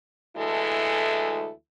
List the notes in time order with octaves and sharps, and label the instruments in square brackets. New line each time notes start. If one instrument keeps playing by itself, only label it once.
[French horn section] D2 E3 G#3 E4 A4